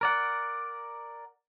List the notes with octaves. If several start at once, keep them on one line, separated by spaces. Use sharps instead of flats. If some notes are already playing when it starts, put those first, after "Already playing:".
A#4 D5 F#5